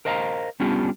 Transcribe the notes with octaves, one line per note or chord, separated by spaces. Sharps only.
A#4 C5 D#5 F5 G#5 A#5
G3 B3 C#4 D4 F4 G4